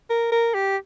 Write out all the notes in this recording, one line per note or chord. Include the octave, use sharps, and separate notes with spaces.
A#4
A#4
G4